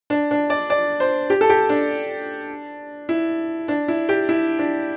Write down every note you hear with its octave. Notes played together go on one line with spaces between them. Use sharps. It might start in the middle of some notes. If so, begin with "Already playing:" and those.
D4
D4
D5
D5
C5
G4
A4
G4
D4
E4
D4
E4
G4
E4
D4